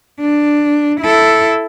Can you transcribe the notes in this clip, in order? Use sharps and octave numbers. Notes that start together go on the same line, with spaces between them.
D4
E4 A4